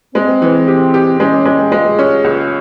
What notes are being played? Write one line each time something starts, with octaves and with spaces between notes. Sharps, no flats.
G#3 C4
E3
G4
G4
G#3 C#4
G#3
G#3 F4
C#4
C#2